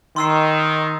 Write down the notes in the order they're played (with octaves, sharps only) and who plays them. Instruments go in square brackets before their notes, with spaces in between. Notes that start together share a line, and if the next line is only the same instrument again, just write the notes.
[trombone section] D#3 [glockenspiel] C6 E6 C7